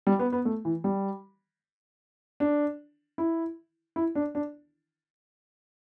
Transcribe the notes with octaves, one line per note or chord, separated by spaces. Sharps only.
G3
B3
B3
A3
E3
G3
D4
E4
E4
D4
D4